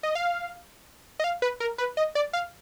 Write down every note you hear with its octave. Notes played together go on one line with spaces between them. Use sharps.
D#5
F5
D#5
F5
B4
A#4
B4
D#5
D5
F5